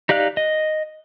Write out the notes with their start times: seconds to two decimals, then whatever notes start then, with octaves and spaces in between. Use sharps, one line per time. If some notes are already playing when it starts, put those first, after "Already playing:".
0.09 D#4 G4 D5 F5 F#6
0.37 D#5